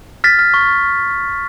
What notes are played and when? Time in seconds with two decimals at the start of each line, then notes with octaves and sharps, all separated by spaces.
0.24 F6 A6 B6
0.39 F6
0.54 C#6